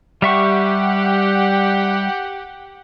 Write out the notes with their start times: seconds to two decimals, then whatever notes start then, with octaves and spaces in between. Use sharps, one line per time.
0.22 G3 G4 E5 F#5 G5 C#6